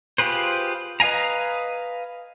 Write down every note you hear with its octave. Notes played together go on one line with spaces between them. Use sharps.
F4 G4 G#4 B4 C5
B4 D#5 F5 G#5 A#5